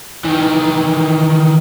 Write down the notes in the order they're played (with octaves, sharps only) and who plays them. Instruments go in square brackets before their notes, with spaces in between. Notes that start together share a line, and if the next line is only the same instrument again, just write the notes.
[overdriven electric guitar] D#3 E3